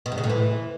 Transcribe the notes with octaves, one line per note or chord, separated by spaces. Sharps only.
B2
G2
C#3
A2
E3